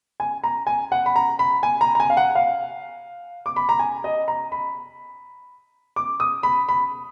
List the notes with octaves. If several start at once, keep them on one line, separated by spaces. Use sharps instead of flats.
G#5
A#5
G#5
F#5
B5
A#5
B5
G#5
A#5
A#5
G#5
F5
F#5
F5
D6
B5
A#5
G#5
D#5
A#5
B5
D6
D#6
B5
B5